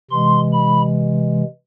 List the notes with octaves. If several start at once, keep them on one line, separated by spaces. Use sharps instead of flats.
C3 E3 G#3 C6
B5